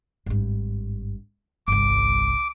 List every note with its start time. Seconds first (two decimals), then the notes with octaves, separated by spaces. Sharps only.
0.26 G#1 G2
1.68 G1 C2 D6